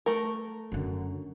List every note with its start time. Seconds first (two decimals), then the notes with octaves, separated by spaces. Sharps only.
0.06 A3 A#4
0.72 F#2 D3